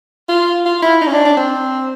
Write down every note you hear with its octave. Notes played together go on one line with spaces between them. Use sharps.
F4
F4
E4
D#4
C#4
D4
D4
C4